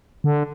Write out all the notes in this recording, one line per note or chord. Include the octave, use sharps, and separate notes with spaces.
D3